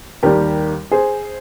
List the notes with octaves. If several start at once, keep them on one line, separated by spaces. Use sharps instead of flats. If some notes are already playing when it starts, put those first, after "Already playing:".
D#2 D#3 G3 G4 A#4
G#4 C5